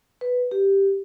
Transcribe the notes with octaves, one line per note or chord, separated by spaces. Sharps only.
B4
G4